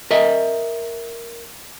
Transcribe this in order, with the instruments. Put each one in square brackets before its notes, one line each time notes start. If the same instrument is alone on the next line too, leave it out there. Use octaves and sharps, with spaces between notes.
[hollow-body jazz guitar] A#4 D#5 E5